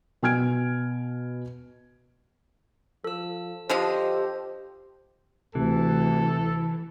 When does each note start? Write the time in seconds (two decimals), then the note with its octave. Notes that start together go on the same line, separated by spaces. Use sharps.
0.23 B2 G#5 F6 G#6 D7
3.04 F3 A4 E6
3.69 D3 F3 G4 C5 D#5
5.55 D2 C3 E3 A4